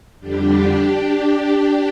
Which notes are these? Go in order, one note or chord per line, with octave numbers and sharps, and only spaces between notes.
F2 D3 G3 D4 G4